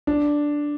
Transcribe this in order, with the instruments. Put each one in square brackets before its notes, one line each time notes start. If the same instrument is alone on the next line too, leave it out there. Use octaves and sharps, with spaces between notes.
[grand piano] D4